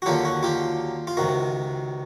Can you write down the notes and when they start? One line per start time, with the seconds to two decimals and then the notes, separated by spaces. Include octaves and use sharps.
0.02 F#4
0.06 D#2 D3 F#3 F4 G4
0.25 F#4
0.43 F4 G4
1.07 F4
1.17 C#2 C3 D#3 F#4